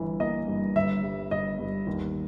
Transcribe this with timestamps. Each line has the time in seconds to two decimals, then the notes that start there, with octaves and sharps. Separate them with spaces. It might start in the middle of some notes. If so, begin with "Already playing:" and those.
Already playing: G1 E3
0.20 A#3 D#5
0.48 G2
0.76 G1 E5
1.03 G3
1.31 G1 D#5
1.59 G2
1.87 D#2